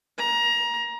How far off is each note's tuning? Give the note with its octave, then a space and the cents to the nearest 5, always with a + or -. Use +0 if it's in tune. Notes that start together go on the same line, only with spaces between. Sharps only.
A#5 +25